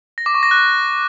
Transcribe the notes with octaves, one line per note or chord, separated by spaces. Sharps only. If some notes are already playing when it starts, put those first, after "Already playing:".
A#6
D6
C#6
A#6
F#6